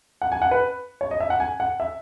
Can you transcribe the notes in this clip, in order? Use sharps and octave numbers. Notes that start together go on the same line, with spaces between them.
F#5
G#5
F#5
B4
C#5
D#5
E5
F#5
G#5
F#5
E5